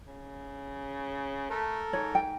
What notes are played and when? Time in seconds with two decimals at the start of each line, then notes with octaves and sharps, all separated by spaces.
0.07 C#3
1.50 A3 A4 A#4
1.93 G#2 C#5
2.15 G5